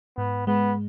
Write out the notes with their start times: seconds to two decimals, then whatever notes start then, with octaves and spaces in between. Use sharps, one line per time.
0.17 G#2 B3
0.47 G#3 B3